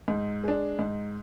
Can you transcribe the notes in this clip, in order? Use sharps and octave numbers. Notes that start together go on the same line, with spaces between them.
G#2
G#3 D4
G#2